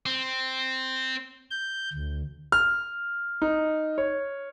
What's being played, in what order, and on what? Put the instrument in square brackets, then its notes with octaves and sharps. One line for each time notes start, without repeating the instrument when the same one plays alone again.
[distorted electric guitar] C4
[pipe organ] G6
D2
[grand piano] F6
D#4
C#5